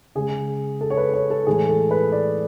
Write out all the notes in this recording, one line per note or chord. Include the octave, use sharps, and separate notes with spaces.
C#3 G#3 G#4
A4
C#5
B4
C#5
A4
A2 E3 G#3 G#4
A4
B4
D5